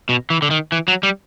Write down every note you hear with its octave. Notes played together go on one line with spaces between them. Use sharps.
B2
E3
D3
D#3
E3
F#3
G3